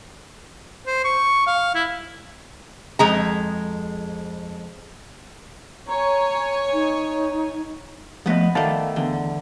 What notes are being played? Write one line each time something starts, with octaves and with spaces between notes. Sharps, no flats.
C5
C#6
F5
E4
F2 G#3 A#5
C#5 G#5 A#5
D#4
F3 A3 B3 B4 D#5
D#3 A3 D5 F5 A5
E2 D3